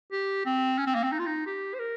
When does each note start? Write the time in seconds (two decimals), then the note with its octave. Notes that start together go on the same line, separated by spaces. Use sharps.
0.12 G4
0.46 C4
0.78 C#4
0.87 C4
0.95 A#3
1.04 C4
1.12 D#4
1.19 F4
1.26 D#4
1.47 G4
1.75 C5
1.80 A#4